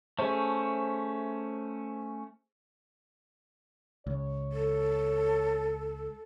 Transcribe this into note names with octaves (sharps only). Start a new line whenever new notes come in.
A3 C#4 G#4 C5
C#2 C#5
A4